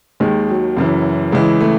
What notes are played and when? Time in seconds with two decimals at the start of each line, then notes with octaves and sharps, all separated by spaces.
0.20 D#2 D#3 G#3
0.49 F#3
0.76 F#1 F#2 E3
1.32 C#2 C#3 E3 G#3
1.61 A3